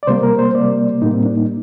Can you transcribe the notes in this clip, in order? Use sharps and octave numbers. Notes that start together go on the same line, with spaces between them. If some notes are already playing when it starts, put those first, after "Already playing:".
D5
C3 G3 A#3 C5
A#4
C5
C3 G3 A#3 D5
A2 G3 A#3 D#4
C4
D4
D#4